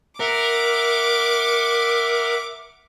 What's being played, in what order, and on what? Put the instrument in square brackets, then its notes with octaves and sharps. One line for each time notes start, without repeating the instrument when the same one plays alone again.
[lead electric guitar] A#4 [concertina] E5 F#5 [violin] D6